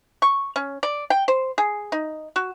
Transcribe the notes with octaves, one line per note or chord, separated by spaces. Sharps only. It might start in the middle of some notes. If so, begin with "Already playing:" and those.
C#6
C#4
D5
G5
C5
G#4
D#4
F#4